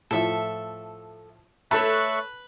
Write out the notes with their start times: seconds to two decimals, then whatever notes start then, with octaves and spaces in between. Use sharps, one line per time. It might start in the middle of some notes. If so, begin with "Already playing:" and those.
0.11 A2 F3 A4 E5
1.71 A3 A4 B4 C#5 E5 A5 C#6 F#6